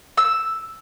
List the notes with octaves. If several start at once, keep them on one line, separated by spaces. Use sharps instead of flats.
E6